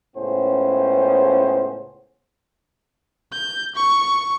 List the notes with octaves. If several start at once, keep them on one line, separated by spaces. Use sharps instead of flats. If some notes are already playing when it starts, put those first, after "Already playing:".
C#2 A2 B3 C#4 C5
G6
C#6